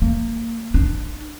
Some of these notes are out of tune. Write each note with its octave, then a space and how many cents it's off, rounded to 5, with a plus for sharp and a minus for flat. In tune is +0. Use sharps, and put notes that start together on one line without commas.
A#3 -25
D4 +25